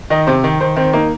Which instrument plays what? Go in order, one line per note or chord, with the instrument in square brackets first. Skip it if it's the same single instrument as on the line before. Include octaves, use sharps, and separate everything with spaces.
[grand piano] D#3 [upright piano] D#5
[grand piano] C3 [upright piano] C5
[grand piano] D#3
[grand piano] D#3 [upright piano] C5
[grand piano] D#3 [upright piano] C4
[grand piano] A#3 [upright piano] D#4